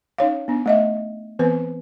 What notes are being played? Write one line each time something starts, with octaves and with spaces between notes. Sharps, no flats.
C#4 D#4 C#5 F5
B3 D4
A3 D#5 E5
E3 B3 C4 B4